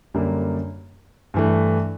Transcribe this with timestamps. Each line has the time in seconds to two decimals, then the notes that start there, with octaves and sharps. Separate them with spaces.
0.14 F#2 D3 G3 A#3
1.34 G2 E3 A3